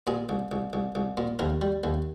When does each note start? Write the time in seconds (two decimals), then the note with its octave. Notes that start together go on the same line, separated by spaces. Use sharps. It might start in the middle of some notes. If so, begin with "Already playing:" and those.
0.07 A#2 G#4
0.29 C2
0.52 C2
0.73 C2
0.95 C2
1.17 A#2
1.39 D#2 A#4
1.61 G3
1.84 D#2